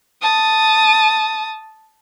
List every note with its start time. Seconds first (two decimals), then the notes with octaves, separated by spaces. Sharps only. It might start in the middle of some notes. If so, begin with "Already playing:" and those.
0.22 A5 D#6